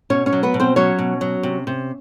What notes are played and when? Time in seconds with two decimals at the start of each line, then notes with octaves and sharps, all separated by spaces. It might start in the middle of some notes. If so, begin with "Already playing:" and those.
0.10 B2 C#4 C#5
0.26 C#4 C#5
0.33 F#3
0.43 B3 B4
0.54 B2
0.60 C4 C5
0.76 F#3 C#4 C#5
0.99 B2
1.21 F#3
1.43 C3
1.67 C3